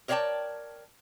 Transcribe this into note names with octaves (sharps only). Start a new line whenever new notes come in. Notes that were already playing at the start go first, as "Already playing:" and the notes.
A#4 C#5 D5 E5 G5 A5